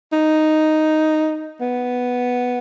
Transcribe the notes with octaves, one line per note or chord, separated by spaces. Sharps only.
D#4
B3